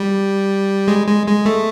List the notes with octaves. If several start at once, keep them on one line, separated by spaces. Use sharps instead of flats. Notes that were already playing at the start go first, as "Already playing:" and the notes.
Already playing: G3
G#3
G#3
G#3
A3